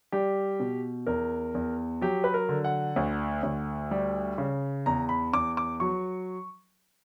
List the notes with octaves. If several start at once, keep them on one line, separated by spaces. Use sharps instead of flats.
G3 G4
B2
E2 A#4
E2
F#3 G4
B4
A#4
D3
F#5
D2
D2
G3
C#3
E2 A#5
B5
E2 D6
D6
F#3 C#6